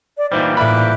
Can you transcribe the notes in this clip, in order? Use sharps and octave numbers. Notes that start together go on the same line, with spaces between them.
D5
A#2 E3 G3 D#4 C5
A2 E5 B5 D6 F#6